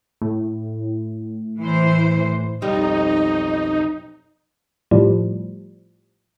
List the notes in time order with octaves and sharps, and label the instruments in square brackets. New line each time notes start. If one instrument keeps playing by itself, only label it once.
[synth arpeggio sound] A2
[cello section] E3 C5
[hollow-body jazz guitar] B1 G3 [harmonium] F2 D#5 [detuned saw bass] D#4
[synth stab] A2 F3 G3